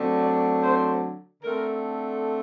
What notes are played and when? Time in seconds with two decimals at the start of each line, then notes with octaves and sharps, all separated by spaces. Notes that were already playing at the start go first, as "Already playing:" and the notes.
Already playing: D3 F#3 A3 C4
0.22 D5
0.62 C5
1.42 D3 A3 C4 A#4